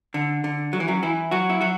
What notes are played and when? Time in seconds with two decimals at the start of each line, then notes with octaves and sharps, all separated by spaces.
0.14 D3
0.44 D3
0.73 F#3
0.80 E3
0.88 F#2 F#3
1.03 E3 E4
1.31 F#3 F#4
1.50 E4
1.61 F#3 F#4